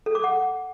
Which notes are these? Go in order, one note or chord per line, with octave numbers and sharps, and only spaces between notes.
A4
D6
F#5